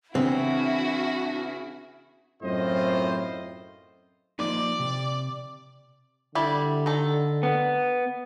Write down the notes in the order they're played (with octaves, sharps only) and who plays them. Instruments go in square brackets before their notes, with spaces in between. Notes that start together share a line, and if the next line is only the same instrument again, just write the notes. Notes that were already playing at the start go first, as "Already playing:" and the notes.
[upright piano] C#3 E3 B3 [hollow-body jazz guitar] C4 [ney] D4 [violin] E4 F#4
[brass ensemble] F#2 A2 C4 F4 C5 D#5
[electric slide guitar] F3 A#3 D#4 [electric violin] D5
[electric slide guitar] C3
[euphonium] D3 [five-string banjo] G3 E4 D5
[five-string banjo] D#3 A4
[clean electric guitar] B3